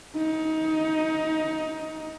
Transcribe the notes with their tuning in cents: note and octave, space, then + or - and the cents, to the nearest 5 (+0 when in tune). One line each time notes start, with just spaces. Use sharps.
D#4 +20